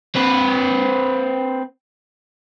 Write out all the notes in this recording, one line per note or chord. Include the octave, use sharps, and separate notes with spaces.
C4 B4